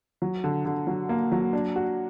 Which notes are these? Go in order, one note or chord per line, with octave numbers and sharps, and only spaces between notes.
F#3
D3
D3
F#3
A#3
F#3
D4
F#4